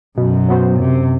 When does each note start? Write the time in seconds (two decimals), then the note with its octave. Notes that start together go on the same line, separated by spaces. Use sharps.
0.17 F#2 B2
0.49 F#3 B3 F#4 C5
0.79 F#2 C3